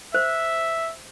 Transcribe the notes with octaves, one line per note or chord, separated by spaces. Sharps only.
C5 E5